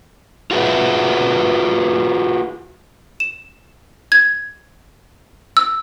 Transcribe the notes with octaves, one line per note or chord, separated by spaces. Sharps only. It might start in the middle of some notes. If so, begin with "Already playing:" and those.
F4 F#4 G#4 B4 E5
E7
G#6
E6